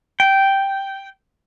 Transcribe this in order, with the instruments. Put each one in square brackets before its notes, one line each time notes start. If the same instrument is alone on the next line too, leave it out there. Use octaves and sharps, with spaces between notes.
[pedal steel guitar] G5